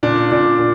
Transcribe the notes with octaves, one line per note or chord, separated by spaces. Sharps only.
A#2 D4
A#2 D4
A#2